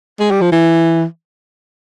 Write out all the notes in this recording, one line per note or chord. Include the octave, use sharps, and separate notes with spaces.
G#3
G3
F3
E3